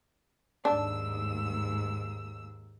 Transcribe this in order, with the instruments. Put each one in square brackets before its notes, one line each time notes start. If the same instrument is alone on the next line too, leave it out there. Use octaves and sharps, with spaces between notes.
[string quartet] D#2 G#2 E6 [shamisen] D4